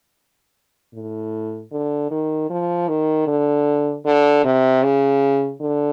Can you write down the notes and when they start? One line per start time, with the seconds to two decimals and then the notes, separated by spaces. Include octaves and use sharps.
0.94 A2
1.72 D3
2.11 D#3
2.50 F3
2.88 D#3
3.27 D3
4.05 D3
4.45 C3
4.83 C#3
5.62 D3